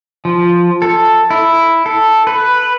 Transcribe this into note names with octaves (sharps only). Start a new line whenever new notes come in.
F3
A4
E4
A4
B4